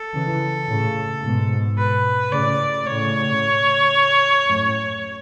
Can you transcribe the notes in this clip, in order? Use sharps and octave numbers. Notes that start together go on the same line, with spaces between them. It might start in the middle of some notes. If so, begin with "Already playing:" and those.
Already playing: A4
C#3 E3
A2 C#3
G#2 B2
B4
A2 C#3 D5
A2 C#3 C#5
F#2 A2